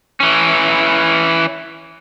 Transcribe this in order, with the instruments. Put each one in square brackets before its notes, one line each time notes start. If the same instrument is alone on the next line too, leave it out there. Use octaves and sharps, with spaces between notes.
[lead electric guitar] E3 C#4